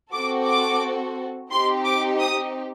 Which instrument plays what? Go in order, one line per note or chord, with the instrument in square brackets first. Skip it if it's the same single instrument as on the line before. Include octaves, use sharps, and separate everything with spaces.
[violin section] C4 F#4 A4 D6
D6
C4 D#4 G4 C6
D6
D#6